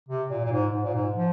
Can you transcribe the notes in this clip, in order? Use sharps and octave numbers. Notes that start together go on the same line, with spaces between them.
C3
A#2
A#2
G#2
G#2
A#2
G#2
F3